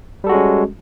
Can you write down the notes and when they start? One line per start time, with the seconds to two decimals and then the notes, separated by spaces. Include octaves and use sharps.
0.24 G3
0.27 A4
0.29 F#4
0.32 G#3
0.35 C#4